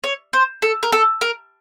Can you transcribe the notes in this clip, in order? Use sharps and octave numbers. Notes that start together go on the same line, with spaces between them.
C#5
C5
A4
A#4
A4
A#4